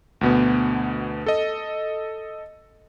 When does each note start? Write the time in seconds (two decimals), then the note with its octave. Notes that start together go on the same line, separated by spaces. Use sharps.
0.21 D2 B2 B3
1.26 A4 D#5